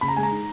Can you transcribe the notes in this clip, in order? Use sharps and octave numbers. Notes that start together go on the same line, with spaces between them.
C#3 B5
A#5
G#3 G#5
A#5
D#4